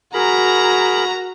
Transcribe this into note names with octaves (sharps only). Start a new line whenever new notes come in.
F#4 G#4 A#4 A#5 B5